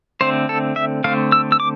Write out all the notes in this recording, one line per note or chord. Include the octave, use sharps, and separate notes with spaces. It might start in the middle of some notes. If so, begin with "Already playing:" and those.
D3 A3 C4 C5
A4
E5
D3 A3 C4 F5
E6
E6
D6